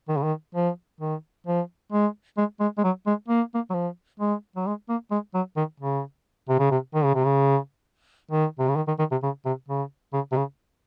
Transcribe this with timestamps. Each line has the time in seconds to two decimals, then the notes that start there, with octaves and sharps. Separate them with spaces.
0.09 D#3
0.17 C#3
0.23 D#3
0.55 F3
1.01 D#3
1.47 F3
1.92 G#3
2.37 G#3
2.60 G#3
2.78 G#3
2.84 F#3
3.06 G#3
3.28 A#3
3.54 A#3
3.70 F#3
3.74 F3
4.20 G#3
4.56 F#3
4.66 G#3
4.89 A#3
5.11 G#3
5.34 F#3
5.56 D#3
5.80 C#3
6.48 C3
6.59 C#3
6.71 C3
6.94 D#3
7.05 C#3
7.14 C3
7.25 C#3
8.31 D#3
8.59 C3
8.68 C#3
8.76 D#3
8.87 D#3
8.99 D#3
9.11 C3
9.23 C#3
9.45 C3
9.68 C#3
10.13 C#3
10.32 C3
10.36 C#3